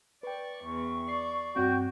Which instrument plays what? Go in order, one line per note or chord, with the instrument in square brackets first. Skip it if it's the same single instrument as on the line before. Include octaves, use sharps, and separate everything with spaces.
[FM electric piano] B4 G5 [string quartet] D5 C#6
[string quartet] E2 [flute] C#6
[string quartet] D5 [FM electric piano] C7
[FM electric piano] G2 C4 [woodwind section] F#4 G5